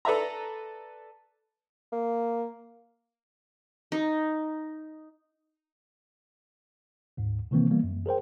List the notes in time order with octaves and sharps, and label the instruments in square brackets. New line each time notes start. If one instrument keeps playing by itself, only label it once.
[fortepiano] A4 B4 D5 E5 A#5
[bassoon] A#3
[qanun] D#4
[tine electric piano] D2 G#2
C3 D#3 E3 A#3 C4
E3 G3 A#3 B3
F#2
G#4 A#4 C5 G5